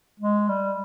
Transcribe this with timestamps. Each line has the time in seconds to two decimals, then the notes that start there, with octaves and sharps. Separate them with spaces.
0.20 G#3
0.49 G3